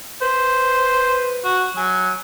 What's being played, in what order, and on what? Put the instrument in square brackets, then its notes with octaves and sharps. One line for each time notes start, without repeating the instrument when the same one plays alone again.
[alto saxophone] B4 [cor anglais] C5
[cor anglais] F#4
[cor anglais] F#3 [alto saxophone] G#5